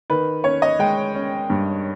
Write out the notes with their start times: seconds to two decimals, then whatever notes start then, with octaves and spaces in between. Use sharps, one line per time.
0.10 D#3 B4
0.44 C#4 C#5
0.62 D#5
0.79 G#3 G5
1.14 C#4
1.50 G2